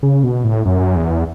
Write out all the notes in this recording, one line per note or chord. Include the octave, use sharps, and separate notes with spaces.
C#3
B2
A2
F#2
E2